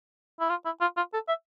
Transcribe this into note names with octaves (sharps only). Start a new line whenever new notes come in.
E4
F4
E4
F4
F4
A4
E5